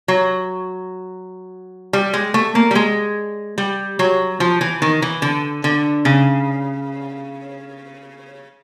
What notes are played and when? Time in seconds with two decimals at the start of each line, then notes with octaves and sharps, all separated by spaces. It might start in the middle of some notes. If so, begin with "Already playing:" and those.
0.08 F#3
1.93 G3
2.13 G#3
2.34 A3
2.55 A#3
2.71 G3
2.75 G#3
3.58 G3
3.99 F#3
4.40 F3
4.61 E3
4.82 D#3
5.02 E3
5.22 D3
5.64 D3
6.05 C#3